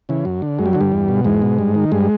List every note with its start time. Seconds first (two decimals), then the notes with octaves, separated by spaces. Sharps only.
0.09 C#3 E3
0.25 F#2
0.42 D3
0.59 F#2 G#3
0.66 G3
0.73 D3 F#3
0.81 G2 G3
0.92 E2
1.08 B2
1.25 E2 G#2 G#3
1.42 B2
1.58 G2
1.75 D#3
1.92 G2 G#3